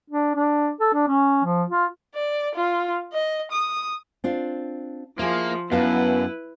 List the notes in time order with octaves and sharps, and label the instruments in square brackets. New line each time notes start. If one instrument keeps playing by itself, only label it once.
[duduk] D4
D4
A4
D4
C#4
F3
F4
[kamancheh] D5
F4
D#5
D#6
[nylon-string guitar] C4 D4 F4
[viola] F3 [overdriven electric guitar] A#3 [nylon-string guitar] E4 G#4
[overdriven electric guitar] F#2 [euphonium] B3 [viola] E4 B4 [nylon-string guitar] F5 A5